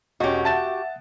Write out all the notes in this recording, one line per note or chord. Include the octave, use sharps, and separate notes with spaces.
E1 C#4 F#4 G4 D#5
E5 F#5 A5 A6 E7